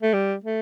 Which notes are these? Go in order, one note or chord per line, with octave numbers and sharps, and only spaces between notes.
A3
G3
A3